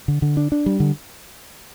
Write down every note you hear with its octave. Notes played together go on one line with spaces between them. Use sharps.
D3
D3
D4
D4
G3
D3